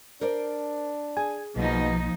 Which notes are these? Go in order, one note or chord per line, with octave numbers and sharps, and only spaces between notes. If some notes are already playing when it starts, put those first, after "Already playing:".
D4 A#4 C5 D5
G#4 G#5
B1 B2 F3 A#3 D#4